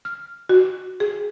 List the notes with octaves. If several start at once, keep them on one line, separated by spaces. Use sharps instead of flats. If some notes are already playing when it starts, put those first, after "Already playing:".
F6
F#4
G#4